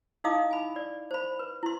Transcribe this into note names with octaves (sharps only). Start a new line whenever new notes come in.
D#4 E4 D#5 F5 D6 D#6
G#5 B5
D5
C5 B5
B4
E4 C6